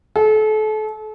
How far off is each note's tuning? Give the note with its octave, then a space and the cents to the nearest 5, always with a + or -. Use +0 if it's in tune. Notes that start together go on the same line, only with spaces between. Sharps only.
A4 -35